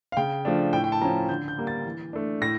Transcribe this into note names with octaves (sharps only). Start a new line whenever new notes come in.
F5
C#3 G5
F3 A3 D4
A2 G5
G5
A5
F3 C#4 A#5
D3 G6
G6
G3 A#3
A6
E3
A3 D4
A2 A#6